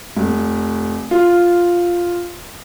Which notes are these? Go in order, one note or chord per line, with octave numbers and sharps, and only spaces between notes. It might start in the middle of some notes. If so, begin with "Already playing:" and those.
F1
F4